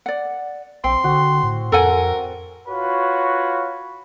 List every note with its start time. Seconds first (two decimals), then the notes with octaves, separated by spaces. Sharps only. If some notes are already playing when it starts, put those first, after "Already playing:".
0.06 D5 F#5
0.84 A#1 C4 G5 C6
1.04 D3 F#4
1.43 A2
1.72 F2 A4 A#4 F#5 G#5
2.69 F4 F#4 B4 C#5